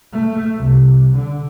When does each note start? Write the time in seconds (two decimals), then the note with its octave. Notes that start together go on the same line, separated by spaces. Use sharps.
0.13 A3
0.56 C2
1.15 D3